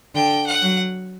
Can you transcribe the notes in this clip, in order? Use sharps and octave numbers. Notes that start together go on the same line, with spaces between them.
D3 G5
F#5
F#3